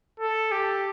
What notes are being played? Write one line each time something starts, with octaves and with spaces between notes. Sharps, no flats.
A4
G4